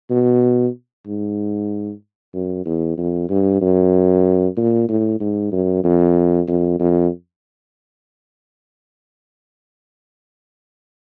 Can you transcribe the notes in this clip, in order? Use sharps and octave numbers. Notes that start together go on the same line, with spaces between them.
B2
G#2
F#2
E2
F2
G2
F#2
A#2
A2
G#2
F#2
F2
F2
F2